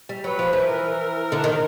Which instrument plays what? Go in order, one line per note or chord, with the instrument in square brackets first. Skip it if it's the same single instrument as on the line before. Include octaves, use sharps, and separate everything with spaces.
[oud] G3
[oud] F#3 [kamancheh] B4
[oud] F3
E3
[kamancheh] A#4
[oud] D3
D#3